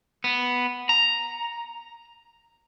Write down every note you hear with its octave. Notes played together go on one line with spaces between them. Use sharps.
B3
A#5